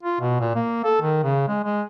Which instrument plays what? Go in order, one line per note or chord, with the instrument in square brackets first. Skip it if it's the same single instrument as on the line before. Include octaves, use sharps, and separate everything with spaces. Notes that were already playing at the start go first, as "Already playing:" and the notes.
[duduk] F4
B2
A#2
A#3
A4
D#3
C#3
G#3
G#3